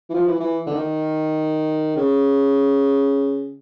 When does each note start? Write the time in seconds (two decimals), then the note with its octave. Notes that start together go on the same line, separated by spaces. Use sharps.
0.09 E3
0.14 F3
0.27 E3
0.40 E3
0.66 D3
0.75 D#3
1.96 C#3